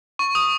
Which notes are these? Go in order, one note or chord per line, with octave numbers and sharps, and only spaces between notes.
C#6
D#6